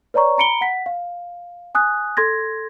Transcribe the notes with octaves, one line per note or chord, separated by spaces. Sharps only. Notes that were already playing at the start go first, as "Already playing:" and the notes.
B4 C#5 D5 A#5 C#6
A#5 B5 C#7 D7 G7
F#5 B6
F5
G#5 D#6 F#6
A4 C6 G#6 A#6